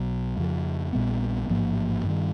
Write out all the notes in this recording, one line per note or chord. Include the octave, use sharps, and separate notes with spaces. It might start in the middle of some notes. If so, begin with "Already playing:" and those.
Already playing: B1 B2 F#3
F2 C#3 F3
A#1 A#2 G3 B3
A1 G#2 F3 A#3
G2 D#3 G3